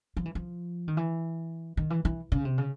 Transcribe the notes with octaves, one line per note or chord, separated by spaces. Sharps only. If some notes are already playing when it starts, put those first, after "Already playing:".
F3
E3
F3
D#3
E3
D#3
E3
E3
C#3
C3
C#3